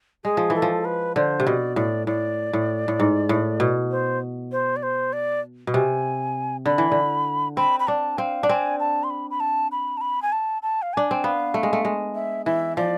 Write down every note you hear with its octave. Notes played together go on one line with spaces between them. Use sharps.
G#3 G#4
F3
E3
A4
F3
B4
D3 C5
C3
B2 D5
A2 D5
A2 D5
A2
A2
G#2
A2
B2
C5
C5
D5
C5
D5
B2
C3 G#5
D3 B5
E3
D3
C4 B5
B5
D4 A5
C4 F5
D4
C4 G#5
A5
C6
B5
B5
A5
B5
A5
B5
G#5
A5
A5
F5
D4 G#5
C4
B3 F5
A3
G#3
A3
G#3
E5
E3 E5
F3 D5